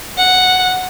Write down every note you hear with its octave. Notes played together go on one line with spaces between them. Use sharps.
F#5